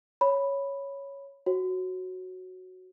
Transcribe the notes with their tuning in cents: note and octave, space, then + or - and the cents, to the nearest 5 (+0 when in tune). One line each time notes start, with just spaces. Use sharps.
C#5 +0 B5 +0
F#4 +0 C#5 -40